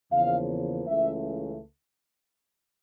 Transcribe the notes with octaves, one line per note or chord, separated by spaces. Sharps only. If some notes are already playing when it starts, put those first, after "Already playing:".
E2 C#3 F3 A#3 F5
C#2 C#3 E3 A3 E5